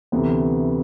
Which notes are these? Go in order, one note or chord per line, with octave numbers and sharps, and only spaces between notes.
D2 C3 E3 B3